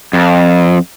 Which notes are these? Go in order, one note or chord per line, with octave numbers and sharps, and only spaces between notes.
F2